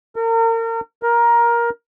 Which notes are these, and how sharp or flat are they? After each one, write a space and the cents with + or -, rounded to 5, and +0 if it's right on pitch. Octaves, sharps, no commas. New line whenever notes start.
A#4 -35
A#4 +15